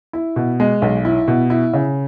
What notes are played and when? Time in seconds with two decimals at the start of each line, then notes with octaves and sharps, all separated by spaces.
0.13 E4
0.36 B2
0.60 G#3
0.82 B1
1.05 E4
1.28 B2
1.50 E4
1.73 C#3